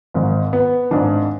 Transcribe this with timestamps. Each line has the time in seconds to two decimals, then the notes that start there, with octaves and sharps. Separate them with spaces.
0.14 G#1 G#2 D#3
0.53 B3
0.91 G#1 G#2 D#3 D4